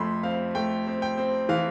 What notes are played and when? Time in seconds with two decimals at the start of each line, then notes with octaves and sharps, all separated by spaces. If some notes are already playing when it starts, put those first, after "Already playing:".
Already playing: F2 A3 B5 C6
0.23 C4 F5
0.55 A3 G5
0.87 C4
1.02 G5
1.18 C4
1.49 E3 F5